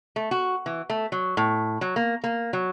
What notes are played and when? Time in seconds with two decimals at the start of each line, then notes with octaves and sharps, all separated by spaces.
0.16 A3
0.31 F#4
0.66 E3
0.90 A3
1.12 F#3
1.37 A2
1.81 F#3
1.96 A#3
2.24 A#3
2.53 F#3